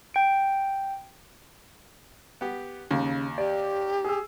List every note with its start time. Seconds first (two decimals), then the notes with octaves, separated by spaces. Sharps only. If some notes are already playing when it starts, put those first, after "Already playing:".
0.14 G5 D7
2.41 B3 G4
2.91 D#2 C#3
3.38 G4 D5
4.04 G#4 E6